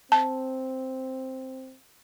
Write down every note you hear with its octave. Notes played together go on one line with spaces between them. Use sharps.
C4 A5